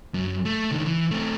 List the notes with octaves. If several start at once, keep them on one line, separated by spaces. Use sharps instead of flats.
F#2
A3
C#2 D#3
E3
A3 C4